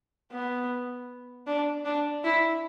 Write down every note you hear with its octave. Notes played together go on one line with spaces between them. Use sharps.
B3
D4
D4
E4